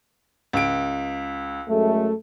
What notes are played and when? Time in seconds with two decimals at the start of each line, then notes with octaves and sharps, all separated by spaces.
0.53 C#2 D7
1.69 F#2 G#3 A3